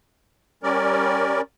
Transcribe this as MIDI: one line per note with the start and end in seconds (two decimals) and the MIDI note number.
0.63 1.41 55
0.63 1.41 61
0.63 1.41 70
0.63 1.41 74